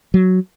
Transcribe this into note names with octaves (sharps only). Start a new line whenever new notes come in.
F#3